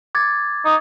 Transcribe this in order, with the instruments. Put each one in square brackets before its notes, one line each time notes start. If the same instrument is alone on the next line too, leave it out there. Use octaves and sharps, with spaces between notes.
[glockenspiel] D6 G#6 A6
[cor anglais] D#4